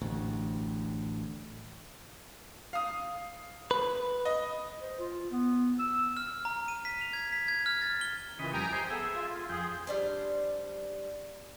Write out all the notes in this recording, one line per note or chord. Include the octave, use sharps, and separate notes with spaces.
A1 D2
F5 D#6
B4
D#5
C5
F4
B3
E6
F6
A#5
D#7
B6
F7
G#6
B6
G#6
F6
A6
G7
A#2 C#3 E3 D#5 B5
F2 G3 G5 G#5 A#5 D#6
G4 C5 D#5
B3 G#4 A4 E5
F4
F2 G#4 G5
G3 D4 C5